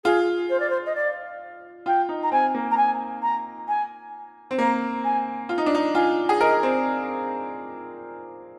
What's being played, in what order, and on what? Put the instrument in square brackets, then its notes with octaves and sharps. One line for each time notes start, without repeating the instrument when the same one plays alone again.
[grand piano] F4 [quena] G#4
[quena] C5
D5
C5
D#5
D5
[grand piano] F4 [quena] G5
[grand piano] D#4
[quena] A#5
[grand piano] C4 [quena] G#5
[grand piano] A#3
[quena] A#5
G#5
A#5
G#5
[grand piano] C4
[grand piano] A#3 [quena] A#5
[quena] G#5
[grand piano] F4
D#4
D4
D#4
[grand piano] F4 [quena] G#5
[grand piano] G#4
[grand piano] A#4 [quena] D#5
[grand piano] C4